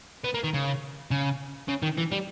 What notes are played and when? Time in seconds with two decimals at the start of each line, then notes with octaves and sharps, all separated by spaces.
0.24 B3
0.34 A#3
0.44 D#3
0.54 C#3
1.11 C#3
1.68 C#3
1.82 D#3
1.97 E3
2.12 G3